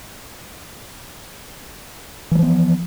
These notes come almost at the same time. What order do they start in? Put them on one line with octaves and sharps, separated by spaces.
E3 G3 F3 B3